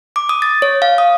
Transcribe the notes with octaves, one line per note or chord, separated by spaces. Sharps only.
D6
D#6
A6
C#5
F5
D#6